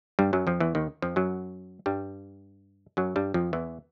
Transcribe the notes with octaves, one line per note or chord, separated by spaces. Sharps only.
G2 G3
F#2 F#3
F2 F3
E2 E3
D#2 D#3
F2 F3
F#2 F#3
G2 G3
F#2 F#3
G2 G3
F2 F3
E2 E3